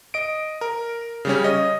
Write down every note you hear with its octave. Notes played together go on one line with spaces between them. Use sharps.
D#5 D7
A#4
C#3 G3 C#4
D#5